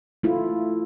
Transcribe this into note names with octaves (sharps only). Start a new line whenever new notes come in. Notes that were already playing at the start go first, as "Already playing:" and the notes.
A3 E4 F4